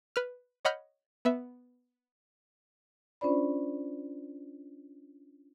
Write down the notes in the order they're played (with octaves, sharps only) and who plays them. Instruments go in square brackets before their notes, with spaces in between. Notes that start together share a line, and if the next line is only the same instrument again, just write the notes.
[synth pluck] B4 F6
C#5 D#5 F#5 B5 F6 G6
B3 E5
[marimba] C#4 D4 F4 C5 D5 B5